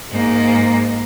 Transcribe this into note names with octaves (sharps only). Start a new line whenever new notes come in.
G#2 A#3